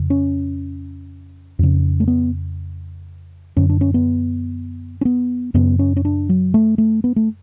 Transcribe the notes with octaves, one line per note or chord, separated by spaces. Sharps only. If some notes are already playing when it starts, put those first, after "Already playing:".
Already playing: F2 C#3
C#4
F2 C#3
A3
B3
F#2 D3 C#4
D4
C#4
B3
C#4
B3
F#2 C#3 B3
C#4
C#4
D4
F#3
A3
A3
B3
A3